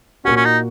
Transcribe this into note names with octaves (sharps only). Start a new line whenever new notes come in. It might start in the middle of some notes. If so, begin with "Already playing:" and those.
A#2 A#3 C#4 F#4
C#4
D#4